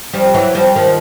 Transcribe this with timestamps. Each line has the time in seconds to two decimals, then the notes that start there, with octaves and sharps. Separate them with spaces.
0.13 F3 G3
0.34 E3 F#3
0.55 F3 G3
0.75 D#3 F3